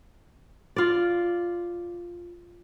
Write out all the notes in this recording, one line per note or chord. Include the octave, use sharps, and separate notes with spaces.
F4 D5